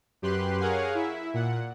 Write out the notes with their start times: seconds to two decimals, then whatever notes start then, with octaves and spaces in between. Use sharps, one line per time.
0.22 F#2 G4 B4 C6 F#6
0.60 G#4 A#4 C#5 F5 F#5 G#5
0.95 E4 E5
1.34 A#2 F#5